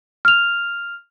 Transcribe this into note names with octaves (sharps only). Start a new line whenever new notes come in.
F6 F7